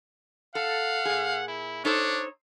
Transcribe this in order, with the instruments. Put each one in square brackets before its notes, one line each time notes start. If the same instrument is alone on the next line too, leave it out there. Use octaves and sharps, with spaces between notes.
[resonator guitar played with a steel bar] A4 [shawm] F5 [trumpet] F#5
[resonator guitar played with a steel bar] A#2 G#4
[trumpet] E4
[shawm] D4 [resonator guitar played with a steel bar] D#4 A4 C5 [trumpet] C#5